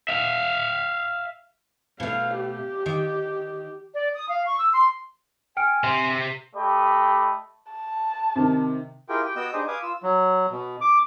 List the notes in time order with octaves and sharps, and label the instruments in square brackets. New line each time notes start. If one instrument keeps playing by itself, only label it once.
[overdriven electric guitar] E5 F5
[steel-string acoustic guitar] B2 A3 [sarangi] F5
[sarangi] G4
[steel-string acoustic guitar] D#3 G5
[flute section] D5
D#6
F5
C#6
E6
C6
[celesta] G5 F6 D7 [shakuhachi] G#5
[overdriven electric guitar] C3 [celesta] C6
[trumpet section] A3 G4 D#5 B5
[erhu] A5
[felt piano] C3 D#3
[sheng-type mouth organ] E4 F4 G4 G#4 A#4 G5
G4 G5
B3 F#4 D#5 G5 E6 G6
D4 D#4 G4 G#4 C5 D#5
B4 F5 G#5 D6 D#6
F4 E6
[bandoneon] F#3
B2
D6